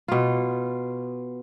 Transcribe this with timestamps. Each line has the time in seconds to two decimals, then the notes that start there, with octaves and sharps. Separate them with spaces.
0.08 B2 F4